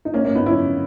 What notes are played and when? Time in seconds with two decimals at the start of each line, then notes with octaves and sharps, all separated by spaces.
0.05 D#4
0.14 A#3 C#4
0.25 A#3 C#4
0.35 B3 D#4
0.46 C#4 E4